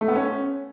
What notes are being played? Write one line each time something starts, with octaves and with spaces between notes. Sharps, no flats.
A3
B3
C#4